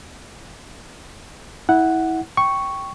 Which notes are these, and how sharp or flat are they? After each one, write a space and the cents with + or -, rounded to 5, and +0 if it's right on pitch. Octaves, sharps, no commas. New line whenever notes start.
E4 -25 F#5 +0
G5 -10 C#6 +0